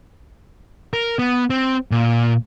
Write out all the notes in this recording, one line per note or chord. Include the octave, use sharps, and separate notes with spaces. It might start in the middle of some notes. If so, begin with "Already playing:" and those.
A#4
B3
C4
A#2